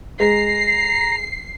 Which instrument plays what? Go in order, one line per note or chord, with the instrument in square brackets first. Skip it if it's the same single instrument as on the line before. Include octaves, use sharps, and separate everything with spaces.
[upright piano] G#3 [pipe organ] A#5 [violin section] C7